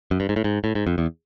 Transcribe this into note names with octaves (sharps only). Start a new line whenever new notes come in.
F#2
G2
G#2
A2
G#2
A2
G#2
F2
E2